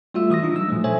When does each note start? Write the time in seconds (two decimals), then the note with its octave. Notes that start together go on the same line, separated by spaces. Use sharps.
0.14 G3 A3 F4 F#4 E5 E6
0.30 E3 D#6 E6 A#6
0.43 D4 D#4 F4
0.54 F#3 G3 E6
0.68 A#2 F3 A3
0.84 A4 C5 C#5 E5 G#5